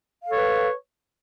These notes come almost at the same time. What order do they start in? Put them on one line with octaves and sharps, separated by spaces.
F5 A4 C#5 B4